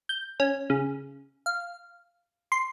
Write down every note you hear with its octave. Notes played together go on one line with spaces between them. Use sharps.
G6
C#4
C#3
F5
C6